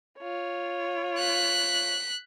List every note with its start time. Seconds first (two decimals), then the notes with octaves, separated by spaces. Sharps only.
0.20 F4 C#5
1.18 F#6 B6